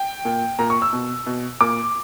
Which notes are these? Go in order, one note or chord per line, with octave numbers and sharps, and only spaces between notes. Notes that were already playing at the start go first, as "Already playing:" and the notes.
Already playing: G5
A#2
A#2 A#5
C#6
E6
B2
B2
A#2 D6